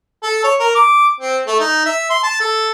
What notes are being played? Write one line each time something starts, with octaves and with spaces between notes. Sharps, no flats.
A4
C#5
A#4
D6
C4
A3
D#4
E5
C6
A5
A4